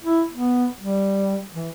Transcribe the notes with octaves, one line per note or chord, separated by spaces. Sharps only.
E4
B3
G3
E3